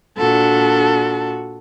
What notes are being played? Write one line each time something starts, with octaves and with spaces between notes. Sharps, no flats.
A#2 D4 F#4 A4